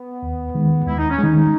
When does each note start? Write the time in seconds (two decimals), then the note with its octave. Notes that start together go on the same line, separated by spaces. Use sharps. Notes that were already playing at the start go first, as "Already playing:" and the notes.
Already playing: B3
0.22 D#2
0.55 D#3 G#3
0.87 D#2 E4
0.98 D#4
1.10 C#4
1.19 D#3 G#3 D#4